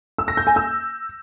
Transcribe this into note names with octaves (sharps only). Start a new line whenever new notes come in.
E6
A#6
G6
G#5
E6